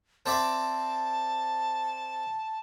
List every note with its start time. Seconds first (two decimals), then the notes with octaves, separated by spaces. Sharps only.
0.26 C4 D5 E5 A5